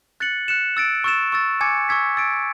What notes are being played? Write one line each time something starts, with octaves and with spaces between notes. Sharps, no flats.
F#6 A6 C#7 F#7
F#6 C#7 E7
E6 A6 D7
C#6 E6 A6 E7
C#6 E6 A6
G#5 D6 G#6 C#7
C#6 E6 G#6 B6
E6 A6 D7